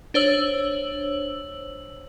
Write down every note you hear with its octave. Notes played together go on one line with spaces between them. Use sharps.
D4 C5 C#5 E6 F#7